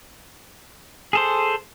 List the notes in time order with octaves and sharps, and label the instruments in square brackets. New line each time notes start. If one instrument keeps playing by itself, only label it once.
[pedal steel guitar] G#4 A4 C5